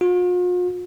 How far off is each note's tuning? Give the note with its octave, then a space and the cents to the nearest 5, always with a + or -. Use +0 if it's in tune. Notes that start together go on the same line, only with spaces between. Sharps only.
F4 +45